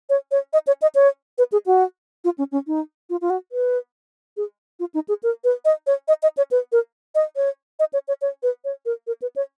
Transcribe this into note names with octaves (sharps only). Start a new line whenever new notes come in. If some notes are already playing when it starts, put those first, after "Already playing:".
C#5
C#5
D#5
C#5
D#5
C#5
B4
G#4
F#4
F4
C#4
C#4
D#4
F4
F4
F#4
B4
G#4
F4
D#4
G#4
A#4
B4
D#5
C#5
D#5
D#5
C#5
B4
A#4
D#5
C#5
D#5
C#5
C#5
C#5
B4
C#5
A#4
A#4
B4
C#5